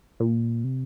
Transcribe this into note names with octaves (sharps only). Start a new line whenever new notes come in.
A#2
C3